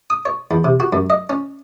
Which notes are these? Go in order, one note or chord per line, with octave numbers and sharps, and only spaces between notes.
D#6
C#5
E2
C3
F#4
F#2
D#5
C#4